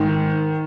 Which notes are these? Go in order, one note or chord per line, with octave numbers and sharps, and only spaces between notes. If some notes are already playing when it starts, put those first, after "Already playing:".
Already playing: G#2 D#3